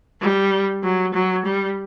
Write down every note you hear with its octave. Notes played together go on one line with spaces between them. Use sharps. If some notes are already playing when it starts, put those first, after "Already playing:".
G3
F#3
F#3
G3